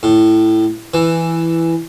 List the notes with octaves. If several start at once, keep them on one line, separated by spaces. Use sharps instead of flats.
A2
E3